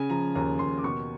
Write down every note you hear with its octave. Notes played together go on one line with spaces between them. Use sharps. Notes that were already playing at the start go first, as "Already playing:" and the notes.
Already playing: C#3 G#5
F3 A#5
D#2 A#5
D#2 C6
D6
B2 C#6